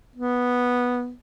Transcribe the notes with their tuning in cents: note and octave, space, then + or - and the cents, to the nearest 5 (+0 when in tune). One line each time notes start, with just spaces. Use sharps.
B3 -5